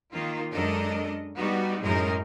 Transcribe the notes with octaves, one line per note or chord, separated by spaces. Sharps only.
D#3 A#3 F4
F#2 G#3 D4 A4 A#4 D#5
G3 B3 D#4 F#4
F#2 A2 G#3 D#4 G#4 A#4